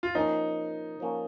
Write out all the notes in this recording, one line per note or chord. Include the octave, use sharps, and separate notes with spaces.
F4
F3 A#3 C#4 D#4
F3 A#3 C#4